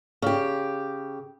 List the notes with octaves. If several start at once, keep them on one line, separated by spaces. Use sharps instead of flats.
C#3 G4